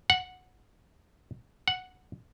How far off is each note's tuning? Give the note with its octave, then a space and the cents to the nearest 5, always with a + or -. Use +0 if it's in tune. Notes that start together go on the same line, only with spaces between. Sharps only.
F#5 -10
F#5 -5